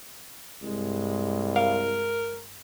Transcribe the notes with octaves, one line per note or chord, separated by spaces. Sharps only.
C2 G2 G#3
A#4 F5